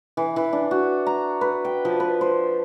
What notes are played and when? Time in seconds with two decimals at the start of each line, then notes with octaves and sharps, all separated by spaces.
0.17 E3
0.36 E3
0.53 D4
0.71 F#4
1.06 A#5
1.41 B4
1.65 G5
1.85 F3
2.00 B4
2.21 C5